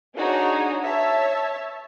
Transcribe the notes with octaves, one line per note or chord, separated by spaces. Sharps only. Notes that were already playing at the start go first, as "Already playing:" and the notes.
D4 D#4 F#4 G#4 C#5
C#5 E5 A5